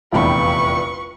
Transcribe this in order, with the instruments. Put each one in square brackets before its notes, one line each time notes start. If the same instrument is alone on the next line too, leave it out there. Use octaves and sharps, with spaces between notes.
[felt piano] F1 A#1 E2 [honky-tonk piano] F4 G5 B5 [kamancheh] B4 C#6